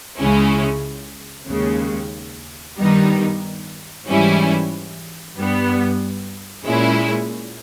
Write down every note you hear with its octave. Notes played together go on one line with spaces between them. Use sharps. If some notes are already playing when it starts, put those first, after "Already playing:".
C#2 C#3 G#3 C#4 E4
D#2 C#3 G#3
G2 D#3 G3 B3 D#4
G#2 E3 G3 C#4 E4
G2 G3 B3
A#2 G#3 C#4 E4